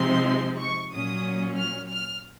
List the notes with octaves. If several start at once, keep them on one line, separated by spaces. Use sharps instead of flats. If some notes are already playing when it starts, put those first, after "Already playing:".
Already playing: C3 F3 G#3 C4 D#4 C6
C#6
A#2 F#3 C#4 D#6
F6
F6